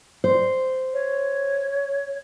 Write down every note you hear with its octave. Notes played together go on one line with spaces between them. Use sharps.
C5
C#5